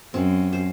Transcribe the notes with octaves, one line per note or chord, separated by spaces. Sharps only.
F#2 C4
C5